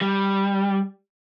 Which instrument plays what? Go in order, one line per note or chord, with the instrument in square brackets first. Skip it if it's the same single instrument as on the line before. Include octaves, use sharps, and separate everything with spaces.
[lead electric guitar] G3